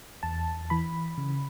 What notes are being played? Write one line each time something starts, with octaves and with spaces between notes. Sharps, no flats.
E2 A5
E3 B5
C#3